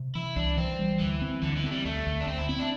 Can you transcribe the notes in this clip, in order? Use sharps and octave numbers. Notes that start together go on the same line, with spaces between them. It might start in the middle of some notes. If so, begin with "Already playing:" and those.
Already playing: C3
E3 E4
C2 D4
E3 C4
G3
D2 E3
C4
D2 D3
E3
A3 C4
G3
D2 A3
D2
D4
D2 C4
E4
C4 E4
D4